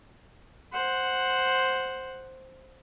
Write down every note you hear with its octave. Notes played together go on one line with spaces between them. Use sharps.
C5 F#5